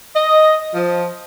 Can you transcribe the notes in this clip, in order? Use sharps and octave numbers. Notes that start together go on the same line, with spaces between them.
D#5
F3